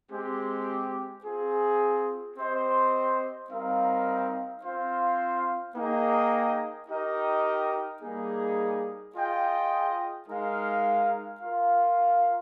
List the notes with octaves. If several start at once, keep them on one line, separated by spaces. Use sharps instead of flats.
G#3 C4 G4
C4 F4 G#4
C4 G4 C5 D#5
G3 C4 D#4 A#4 F5
C4 F4 C5 F5
A#3 D#4 G#4 D#5 G5
D#4 G4 A#4 D#5 G5
G3 A#3 D#4 G#4
F4 G#4 D#5 G5
G#3 D#4 A#4 F5
F4 A#4 F5